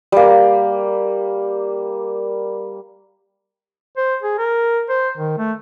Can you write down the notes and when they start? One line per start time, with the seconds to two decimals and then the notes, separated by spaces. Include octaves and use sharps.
0.12 G3 A#3
3.97 C5
4.23 G#4
4.38 A#4
4.89 C5
5.18 D#3
5.39 A3